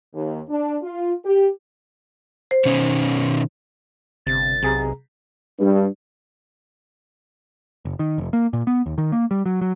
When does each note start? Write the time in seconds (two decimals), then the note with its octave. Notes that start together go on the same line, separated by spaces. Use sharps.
0.13 D#2
0.48 D4
0.83 F4
1.24 G4
2.51 C5
2.65 B2 D#3 C#4
4.27 G1 C3 A6
4.63 B1 C3 G#4 A#5
5.58 G2
7.85 F#1
7.99 D#3
8.18 F1
8.33 A#3
8.53 A#2
8.67 B3
8.86 D#2
8.98 D#3
9.12 A#3
9.31 G3
9.46 F#3
9.61 F#3